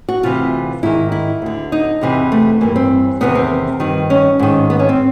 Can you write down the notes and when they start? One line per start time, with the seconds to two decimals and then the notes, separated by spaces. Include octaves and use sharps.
0.09 F#4
0.23 D2 C3 E3 F4
0.83 G#2 D#3 E4
1.12 E4
1.42 D2 D3
1.72 D#4
2.01 E2 C3 E3
2.32 A3
2.61 G2 E3 A#3
2.76 C4
3.21 E2 C3 D#3 B3
3.35 C4
3.80 G2 D#3
4.10 C#4
4.39 G#2 D#3
4.70 B3
4.79 C#4
4.89 C4